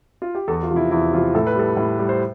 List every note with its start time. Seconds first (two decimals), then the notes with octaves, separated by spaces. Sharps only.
0.22 F4
0.35 G4
0.48 E2 A4
0.63 F4
0.70 C3 F3
0.76 E4
0.91 E2 E4
1.13 C3 F3 F4
1.35 A2 A4
1.47 B4
1.55 G3 A4
1.77 A2
1.99 G3
2.09 C5